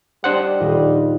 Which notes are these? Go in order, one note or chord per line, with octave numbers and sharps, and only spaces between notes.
G3 D4 C5 D#5 F#5
D#1 F4 D#5